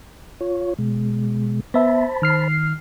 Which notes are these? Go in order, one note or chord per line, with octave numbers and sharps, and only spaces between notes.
F4 C#5
B2 G#3
B3 C5 E5 A5 B5
D#3 F6 C7